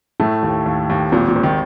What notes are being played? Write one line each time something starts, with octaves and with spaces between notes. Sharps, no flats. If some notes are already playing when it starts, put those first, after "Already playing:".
A2 A3
D#2
D#2
D#2
G#1 A#2
A#2
G#1
D#3